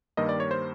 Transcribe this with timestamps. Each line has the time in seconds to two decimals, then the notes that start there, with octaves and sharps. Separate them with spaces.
0.17 G2 D#3 G3 A#3 D#5
0.29 D5
0.40 C#5
0.51 C5